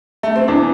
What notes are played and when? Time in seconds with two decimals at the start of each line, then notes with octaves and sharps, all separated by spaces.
0.23 A3
0.36 C4
0.48 E2 E3 D4